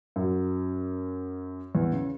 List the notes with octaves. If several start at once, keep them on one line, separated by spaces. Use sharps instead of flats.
F#2 F#3
E2 E3
C#3